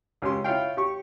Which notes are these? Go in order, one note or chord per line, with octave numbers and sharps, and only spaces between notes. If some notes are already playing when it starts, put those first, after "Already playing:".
C#2 C#4 G4 C6
E4 F4 C#5 F5 G5
G4 C#6